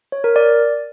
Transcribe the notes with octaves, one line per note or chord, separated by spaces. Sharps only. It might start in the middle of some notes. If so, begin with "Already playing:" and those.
C#5
A#4
D5